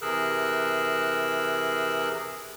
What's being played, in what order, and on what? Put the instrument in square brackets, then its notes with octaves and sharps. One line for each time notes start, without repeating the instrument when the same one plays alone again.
[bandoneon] C3 E3 G#4 A#4 E6 F#6